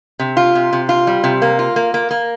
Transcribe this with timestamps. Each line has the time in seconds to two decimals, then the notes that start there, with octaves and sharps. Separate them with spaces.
0.19 C3
0.37 F4
0.55 C3
0.73 C3
0.89 F4
1.07 G3
1.24 C3
1.42 A#3
1.59 F4
1.76 A#3
1.94 A#3
2.11 A#3